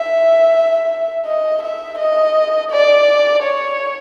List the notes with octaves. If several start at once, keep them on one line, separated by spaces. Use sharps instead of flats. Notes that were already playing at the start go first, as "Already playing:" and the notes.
Already playing: E5
D#5
E5
D#5
D5
C#5